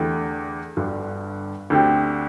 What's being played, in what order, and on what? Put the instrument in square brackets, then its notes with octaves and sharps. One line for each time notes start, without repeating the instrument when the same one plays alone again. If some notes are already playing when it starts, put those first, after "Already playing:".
Already playing: [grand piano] E2 D3 A3 E4 G4
G1 G2 D3
D2 D3 C4 G4